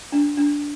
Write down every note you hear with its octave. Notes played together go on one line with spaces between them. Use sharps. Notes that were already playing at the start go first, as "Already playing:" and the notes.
D4
D4